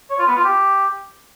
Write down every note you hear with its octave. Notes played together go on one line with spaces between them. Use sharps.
C#5
F4
B3
F4
G4